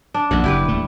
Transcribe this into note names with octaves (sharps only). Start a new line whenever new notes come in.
D4
A#1 F#2 F#5
F#1 E4 G4 B4
D#1 A3